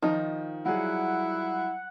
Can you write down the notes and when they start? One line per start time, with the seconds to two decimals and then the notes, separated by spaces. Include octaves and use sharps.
0.03 D#3 F3 D#4
0.66 F#3 G3 E4 G#4 F#5